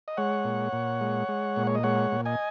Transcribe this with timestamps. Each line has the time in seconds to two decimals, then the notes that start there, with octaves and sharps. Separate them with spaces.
0.08 D#5
0.17 G#3 C#5 F#5
0.45 A#2
0.73 A#2
1.01 G#3
1.28 G#3
1.56 A#2
1.67 C#5
1.75 D#5
1.83 G#3 C#5 F#5
2.12 A#2
2.25 D#5 G#5